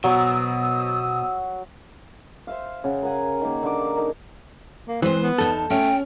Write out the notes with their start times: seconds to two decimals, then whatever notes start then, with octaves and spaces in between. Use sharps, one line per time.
0.04 B2 F#3 C5 D#6 E6
2.47 C5 E5 F5
2.84 C#3 F#5
3.02 A#4 F5 F#5 G#5
3.42 D#3 A#3
3.63 D3 A#3 D6
3.97 D#4 A#4
4.88 A#3
5.02 E3 G#3 C4 B4 C5
5.22 B3
5.38 E2 D#4 A4 A5
5.70 A3 C#4 C#5 G5